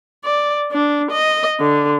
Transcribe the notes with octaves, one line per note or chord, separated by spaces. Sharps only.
D5
D4
D#5
D3